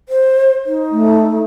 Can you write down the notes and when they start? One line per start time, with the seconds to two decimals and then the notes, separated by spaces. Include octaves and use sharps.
0.09 C5
0.66 D#4
0.92 A3